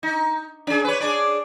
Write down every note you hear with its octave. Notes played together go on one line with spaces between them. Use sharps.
D#4
C#4 G#4
B4 C#5
D4 G#4 D5